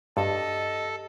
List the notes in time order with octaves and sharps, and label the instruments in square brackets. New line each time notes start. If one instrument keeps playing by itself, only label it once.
[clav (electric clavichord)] G2 [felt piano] G4 [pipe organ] A4 [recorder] D#5